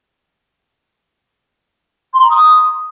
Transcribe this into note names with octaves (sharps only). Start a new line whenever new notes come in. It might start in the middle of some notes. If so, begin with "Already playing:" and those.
C6
A#5
D#6